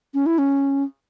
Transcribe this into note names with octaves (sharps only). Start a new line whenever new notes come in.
C#4
E4
C#4